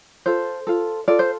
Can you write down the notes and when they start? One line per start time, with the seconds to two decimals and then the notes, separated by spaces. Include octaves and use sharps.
0.26 F4 A4 C5
0.67 F4 A4
1.08 F4 A4 D5
1.19 C5